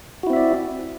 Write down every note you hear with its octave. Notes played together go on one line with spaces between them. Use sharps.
C4 E4 F#4 D5 E5